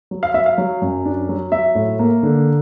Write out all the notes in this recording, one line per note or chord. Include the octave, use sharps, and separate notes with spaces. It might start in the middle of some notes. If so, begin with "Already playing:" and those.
F#3
F5
F#3 E5
F5
F#3
F#2
D4
F#3
F#3 E5
A2
A#3
D3